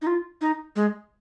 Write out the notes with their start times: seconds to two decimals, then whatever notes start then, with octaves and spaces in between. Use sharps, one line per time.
0.02 D#4
0.07 F4
0.41 D#4
0.76 G#3